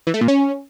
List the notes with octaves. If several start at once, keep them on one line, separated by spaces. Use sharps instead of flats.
E3
A3
A#2
C#4